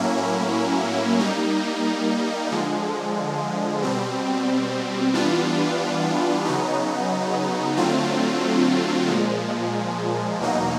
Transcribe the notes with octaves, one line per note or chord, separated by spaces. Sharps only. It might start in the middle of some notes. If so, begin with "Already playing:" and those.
Already playing: A2 F#3 A#3 C#4 E4
G3 A#3 D#4
D3 F3 G#3
B2 G3 C4
E3 G3 B3 D4 F4
C#3 F#3 B3 D#4
D3 F#3 A3 C4 F4
A#2 F3 G#3
E2 B2 F#3 A#3 D#4